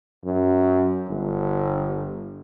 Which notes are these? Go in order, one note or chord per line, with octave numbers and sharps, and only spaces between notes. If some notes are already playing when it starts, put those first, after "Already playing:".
F#2
G1